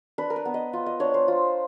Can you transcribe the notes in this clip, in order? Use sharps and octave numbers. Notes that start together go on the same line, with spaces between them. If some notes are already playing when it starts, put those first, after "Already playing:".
D4 B4
A#4
B4
B3
D#5
F4
D#5
D4 C#5
C5
F4